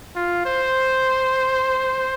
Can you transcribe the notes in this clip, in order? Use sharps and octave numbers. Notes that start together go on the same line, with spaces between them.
F4
C5